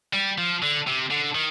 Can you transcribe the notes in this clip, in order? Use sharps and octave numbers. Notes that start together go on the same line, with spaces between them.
G3
F3
D3
C3
D3
D#3